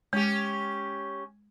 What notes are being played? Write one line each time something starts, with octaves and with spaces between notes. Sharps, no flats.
G#3 C#4 G4